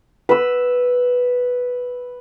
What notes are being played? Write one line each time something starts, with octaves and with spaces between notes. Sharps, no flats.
B4 E6